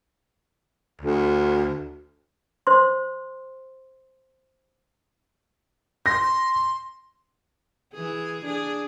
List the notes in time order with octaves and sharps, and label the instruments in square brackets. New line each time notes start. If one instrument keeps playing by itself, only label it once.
[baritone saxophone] D2
[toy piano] C5 C6
[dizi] C6 [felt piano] A#6
[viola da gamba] E3 G#4
D4 G#4